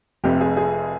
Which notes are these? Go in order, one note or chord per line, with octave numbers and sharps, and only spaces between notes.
F1 F2 C3 G4
G#4
G#4